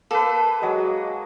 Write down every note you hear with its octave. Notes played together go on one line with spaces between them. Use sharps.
A#3 A4 B4
F#3 G#3